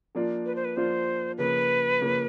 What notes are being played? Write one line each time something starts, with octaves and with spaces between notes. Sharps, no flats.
F3 A#3 D4 F4
B4
C5
B4
F3 A#3 D4 F4 C5
C#3 F3 A#3 B4
C#3 F3 A#3